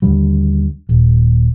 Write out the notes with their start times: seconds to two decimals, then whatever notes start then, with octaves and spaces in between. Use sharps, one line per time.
0.02 D#2 D3 G3
0.89 D#1